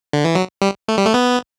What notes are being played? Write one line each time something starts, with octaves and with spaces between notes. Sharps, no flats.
D3
E3
F#3
G3
A3
G3
A3
B3